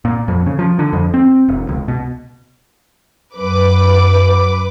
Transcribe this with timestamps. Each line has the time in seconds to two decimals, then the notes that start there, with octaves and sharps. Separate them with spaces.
0.05 A#2
0.28 F2
0.46 C#3
0.59 F3
0.79 D3
0.93 F2
1.14 C4
1.49 E1
1.69 C#2
1.88 B2
3.37 F#2 B4 D6